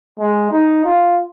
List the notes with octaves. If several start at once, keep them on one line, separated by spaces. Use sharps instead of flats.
G#3
D#4
F4